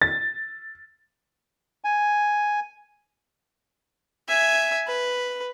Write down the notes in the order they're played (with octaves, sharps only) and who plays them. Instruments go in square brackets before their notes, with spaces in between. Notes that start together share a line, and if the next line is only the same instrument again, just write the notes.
[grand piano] A6
[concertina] G#5
[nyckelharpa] E5 G#5
B4